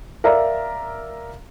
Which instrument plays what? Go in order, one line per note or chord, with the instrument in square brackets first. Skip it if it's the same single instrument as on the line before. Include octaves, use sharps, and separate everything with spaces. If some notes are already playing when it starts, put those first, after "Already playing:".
[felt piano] A#4 D5 E5 F5 A#5